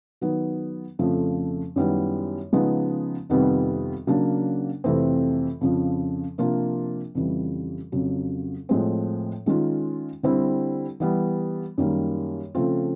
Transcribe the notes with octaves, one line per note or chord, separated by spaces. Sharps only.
D#3 F#3 B3 D#4
F2 C#3 F3 A3
F#2 D#3 G3 B3 E4
C#3 F3 G#3 B3 D#4
F2 C3 D#3 G3 B3
C#3 F#3 A#3 D4
F2 C3 E3 A3 C4
F2 C#3 F3
C3 F3 A#3 D4 F4
F2 C#3 E3 G3
F2 C#3 F#3
A2 F3 G#3 C4
D#3 G#3 C#4 F4
D3 G3 C4 E4
E3 G3 B3
F#2 D#3 G3 A#3
C#3 F3 A3 C4 F4